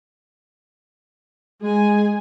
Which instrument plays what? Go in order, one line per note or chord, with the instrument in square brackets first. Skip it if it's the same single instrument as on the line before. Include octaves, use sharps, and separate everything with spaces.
[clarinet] G#3 [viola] G#4 G#5